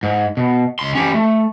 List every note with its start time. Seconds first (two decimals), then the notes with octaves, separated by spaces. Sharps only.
0.03 G#2
0.37 B2
0.79 C#2 C6
0.95 C#4 G4
1.14 A3